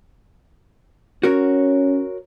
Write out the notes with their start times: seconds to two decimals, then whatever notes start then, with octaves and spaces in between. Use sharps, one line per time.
1.23 C#4 F#4 A#4 C#5